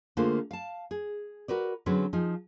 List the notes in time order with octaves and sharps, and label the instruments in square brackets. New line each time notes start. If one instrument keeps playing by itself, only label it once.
[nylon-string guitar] D3 A3 A#3 F4 G#4 C5
F5 A5
G#4
F#4 A#4 B4 D5
D3 F#3 C4 C#4 G#4 B4
F3 D#4 G#4